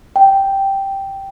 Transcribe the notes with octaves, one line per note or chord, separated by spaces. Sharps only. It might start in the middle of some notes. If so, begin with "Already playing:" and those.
G5